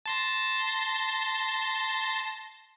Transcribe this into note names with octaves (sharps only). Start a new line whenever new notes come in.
A5 C6 A#6